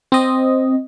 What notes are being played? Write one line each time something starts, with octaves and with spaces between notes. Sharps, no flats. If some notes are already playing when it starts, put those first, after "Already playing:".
C4 D#5